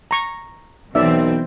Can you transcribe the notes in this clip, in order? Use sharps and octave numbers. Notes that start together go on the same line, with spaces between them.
A#5 C#6
B1 B2 E3 C4 D5 E5